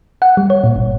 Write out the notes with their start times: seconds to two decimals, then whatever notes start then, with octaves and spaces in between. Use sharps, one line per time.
0.22 F#5
0.37 G3
0.50 C#5
0.64 A#2
0.76 G1